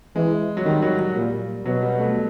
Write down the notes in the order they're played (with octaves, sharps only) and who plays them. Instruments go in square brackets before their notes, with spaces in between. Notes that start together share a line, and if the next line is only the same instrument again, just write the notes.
[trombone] E3 [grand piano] G#3
[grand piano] F#3
[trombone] D#3 [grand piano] G3
[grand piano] F#3
F#3
[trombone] A#2 [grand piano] G3
[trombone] B2 [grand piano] F#3
[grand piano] G3
A3